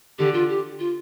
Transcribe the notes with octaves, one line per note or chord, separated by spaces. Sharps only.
D3 G4
F4
G4
F4